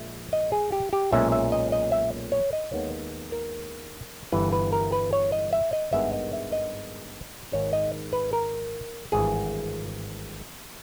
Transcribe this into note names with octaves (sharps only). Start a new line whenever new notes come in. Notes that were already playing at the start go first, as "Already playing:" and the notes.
Already playing: A#1 A#2 G#3 E5
D#5
G#4
G4
G4
B1 A#2 G#3 C#4 E5
E5
D#5
D#5
E5
C#5
D#5
D#2 D#3 G#3 B3 C#5
A#4
G1 G2 E3 B4
B4
A#4
B4
C#5
D#5
E5
D#5
G#1 G2 D#3 G#3 B3 E5
D#5
E5
D#5
G#1 G#2 D#3 C#5
D#5
B4
A#4
G#1 G2 E3 G#4